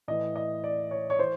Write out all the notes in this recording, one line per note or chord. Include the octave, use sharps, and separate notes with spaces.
A2 E3 D#5
D#5
D5
C#5
C#5
E3 C5